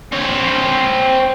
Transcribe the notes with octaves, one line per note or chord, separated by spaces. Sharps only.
C4 C#5